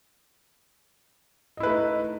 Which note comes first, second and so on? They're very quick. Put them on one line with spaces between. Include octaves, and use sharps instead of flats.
D#5 E4 B4 A3 D#4